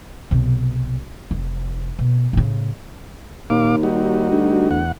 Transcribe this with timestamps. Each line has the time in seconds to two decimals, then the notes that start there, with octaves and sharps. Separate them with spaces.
0.31 B1 C3
1.31 F1
1.99 B2
2.33 A2 C#3
3.50 D#2 A#2 F5 D6
3.83 G3 D#4 F#4
4.31 D2
4.71 E2 F#5